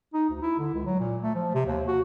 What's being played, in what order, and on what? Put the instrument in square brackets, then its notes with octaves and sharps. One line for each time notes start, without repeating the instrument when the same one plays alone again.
[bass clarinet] D#4
D2
E4
D3
C#2
F#3
A#2
A3
F3
C3
D#2
F#4